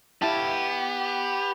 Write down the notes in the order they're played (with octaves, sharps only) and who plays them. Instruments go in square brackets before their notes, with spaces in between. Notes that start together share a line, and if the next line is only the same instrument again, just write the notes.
[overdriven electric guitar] B3 F5 [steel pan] E4 A5 [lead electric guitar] G4